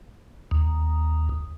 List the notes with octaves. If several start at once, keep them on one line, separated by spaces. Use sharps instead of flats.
D#2